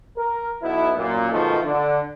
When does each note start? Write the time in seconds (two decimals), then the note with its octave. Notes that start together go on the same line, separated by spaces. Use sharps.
0.17 A#4
0.63 B1 B2 B3 E4
0.97 F#2 A#2
1.31 G#2 B2 D#3 F3 A3
1.64 D3